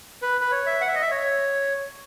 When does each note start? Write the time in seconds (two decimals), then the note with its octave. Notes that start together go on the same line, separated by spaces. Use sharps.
0.22 B4
0.41 B4
0.52 C#5
0.66 E5
0.81 F#5
0.88 E5
0.95 D#5
1.02 E5
1.11 C#5